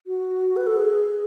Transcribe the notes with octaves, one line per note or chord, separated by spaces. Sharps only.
F#4
B4
A4
G#4